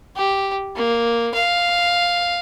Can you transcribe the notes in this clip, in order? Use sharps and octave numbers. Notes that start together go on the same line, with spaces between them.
G4
A#3
F5